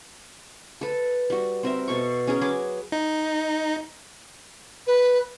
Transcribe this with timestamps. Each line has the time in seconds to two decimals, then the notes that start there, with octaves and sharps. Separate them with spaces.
0.81 A4 B4
1.30 G3 F#4
1.63 C4 A#4 E5
1.88 B2 A4 C#6
2.27 C#4 G#4 A#4
2.41 F#3 G#4 B4 D6
2.92 D#4
4.87 B4